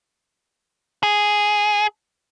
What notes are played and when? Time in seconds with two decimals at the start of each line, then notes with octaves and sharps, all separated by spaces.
1.03 G#4